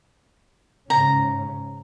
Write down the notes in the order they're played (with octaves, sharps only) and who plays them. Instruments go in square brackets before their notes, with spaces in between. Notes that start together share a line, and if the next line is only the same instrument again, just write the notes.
[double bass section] G#2 C#3 C#4 [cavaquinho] A#5